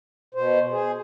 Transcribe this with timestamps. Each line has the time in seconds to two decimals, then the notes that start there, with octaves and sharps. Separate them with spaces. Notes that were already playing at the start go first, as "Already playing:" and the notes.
0.34 B2 C5
0.72 G#4